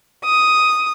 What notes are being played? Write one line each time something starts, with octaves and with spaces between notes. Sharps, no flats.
D#6